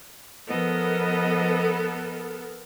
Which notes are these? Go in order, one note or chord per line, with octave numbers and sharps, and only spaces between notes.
F3 B3 A4 A#4 D#5